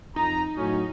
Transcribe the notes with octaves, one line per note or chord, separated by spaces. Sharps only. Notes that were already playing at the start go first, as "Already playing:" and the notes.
F2 D#4 A#5
A2 F#3 C#4